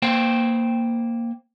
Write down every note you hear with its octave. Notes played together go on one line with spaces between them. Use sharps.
A#3 C5 G5